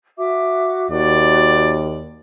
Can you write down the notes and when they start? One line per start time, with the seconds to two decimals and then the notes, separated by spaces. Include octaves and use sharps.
0.17 F#4 E5 D6
0.91 D#2 F#4 D5